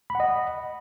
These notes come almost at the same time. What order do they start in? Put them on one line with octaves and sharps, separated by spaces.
B5 F#5 D#5